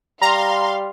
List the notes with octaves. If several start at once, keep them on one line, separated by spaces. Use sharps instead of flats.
G3 F5 A#5 C6